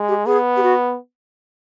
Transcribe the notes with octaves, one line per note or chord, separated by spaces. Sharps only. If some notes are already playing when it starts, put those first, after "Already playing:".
Already playing: G#3
G4
B3 G#4
G4
F#4